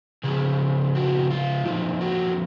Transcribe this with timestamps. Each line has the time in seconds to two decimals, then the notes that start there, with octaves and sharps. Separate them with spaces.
0.24 C#3 F3 B3 G#4
0.95 F#4
1.30 F4
1.65 F2 F3 A#3 D#4
2.01 F#4